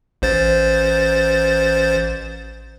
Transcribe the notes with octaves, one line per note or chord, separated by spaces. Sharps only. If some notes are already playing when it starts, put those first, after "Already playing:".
A1 C5 A6